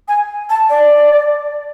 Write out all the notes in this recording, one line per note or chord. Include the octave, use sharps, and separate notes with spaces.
G#5
A5
D5